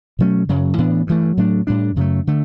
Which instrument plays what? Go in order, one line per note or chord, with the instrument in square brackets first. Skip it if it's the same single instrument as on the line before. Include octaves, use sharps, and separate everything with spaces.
[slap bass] B2 F#3 A3 C#4
F#2 C#3 F#3
A2 E3 B3 D4
G2 E3 A3
A2 F#3 A3 D4
A2 G3 D4
F#2 C#3 F#3 A3
D3 A3